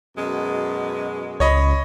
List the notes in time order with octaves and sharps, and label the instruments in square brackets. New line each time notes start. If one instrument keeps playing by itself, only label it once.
[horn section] F#2 B2 G#3
[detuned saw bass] C#2 [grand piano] C#5 D#5 B5